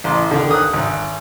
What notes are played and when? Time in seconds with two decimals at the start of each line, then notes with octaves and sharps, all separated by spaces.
0.04 A1 C6
0.31 D3 D#3
0.51 D#6 F#6
0.74 G#1